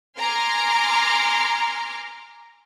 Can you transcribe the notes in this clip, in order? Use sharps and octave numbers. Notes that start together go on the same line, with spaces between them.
G#5 A#5 C6 D6 F6